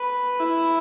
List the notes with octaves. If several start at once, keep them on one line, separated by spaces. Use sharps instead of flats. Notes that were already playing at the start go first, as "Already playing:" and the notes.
Already playing: B4
E4